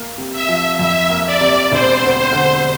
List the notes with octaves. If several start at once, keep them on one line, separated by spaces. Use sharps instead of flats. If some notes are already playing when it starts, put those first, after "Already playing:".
Already playing: A#3
C3
E5
F3
F2 E5
A#3
D5
C3
E1 C5
D2
C5
D3